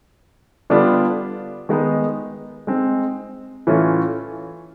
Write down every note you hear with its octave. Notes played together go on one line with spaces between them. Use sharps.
D3 G3 B3 D4 F4
D#3 G#3 B3 D#4
G#3 C4 D#4
A2 E3 A3 C#4 F4